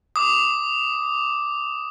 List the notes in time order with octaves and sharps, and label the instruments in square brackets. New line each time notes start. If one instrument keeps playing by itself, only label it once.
[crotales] D6 D#6